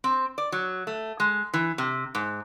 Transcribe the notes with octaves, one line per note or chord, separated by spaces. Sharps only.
C4
D5
F#3
A3
G#3
E3
C3
G#2